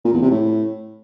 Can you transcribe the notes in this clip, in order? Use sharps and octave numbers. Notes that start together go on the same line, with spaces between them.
A#2
E2
C3
A2